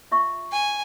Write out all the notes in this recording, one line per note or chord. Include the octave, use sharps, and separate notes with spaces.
F4 E5 C#6
G#5